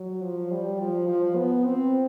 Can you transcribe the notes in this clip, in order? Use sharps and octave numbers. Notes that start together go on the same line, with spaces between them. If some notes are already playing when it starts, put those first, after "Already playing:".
Already playing: F#3
F3
G3
F3
F3
B3
C4